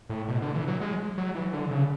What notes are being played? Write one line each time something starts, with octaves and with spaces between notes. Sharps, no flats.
A2
B2
D3
E3
F#3
G#3
F#3
E3
D3
C#3